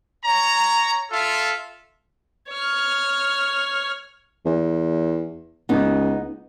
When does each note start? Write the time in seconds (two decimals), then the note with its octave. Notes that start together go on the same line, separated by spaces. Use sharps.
0.25 C#5 A#5
1.11 F4 A4 E5
2.50 C#5 F6
4.46 E2
5.69 C#2 B3 D#4